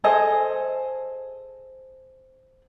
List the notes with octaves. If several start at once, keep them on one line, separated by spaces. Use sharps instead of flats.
G#4 A4 C5 D#5